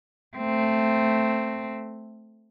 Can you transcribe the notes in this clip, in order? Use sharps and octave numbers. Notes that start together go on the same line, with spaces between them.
A3 C4